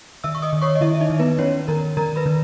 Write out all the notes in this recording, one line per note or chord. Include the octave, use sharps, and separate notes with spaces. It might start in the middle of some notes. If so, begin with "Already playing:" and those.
D#3 E5 E6
C#6
D#5 D#6
D#3
C#5 C#6
D#5
D#3 E4 E5
E5
D#4 D#5
D#3
B3 B4
D#3 C#4 C#5
D#3 A#4 A#5
D#3 A#4 A#5
B4 B5
D#3